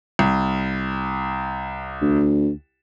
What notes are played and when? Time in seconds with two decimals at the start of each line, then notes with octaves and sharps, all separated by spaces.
0.19 C2
2.02 D2